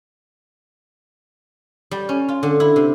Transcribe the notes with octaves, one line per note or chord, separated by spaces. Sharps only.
G3
C#4
F4
D3
E4
C3